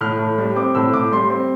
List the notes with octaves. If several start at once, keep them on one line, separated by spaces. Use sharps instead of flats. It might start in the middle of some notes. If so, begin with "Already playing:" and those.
A2 F6
A2
G3
C4 D6
A2 E6
A2 D6
G3 C6
C4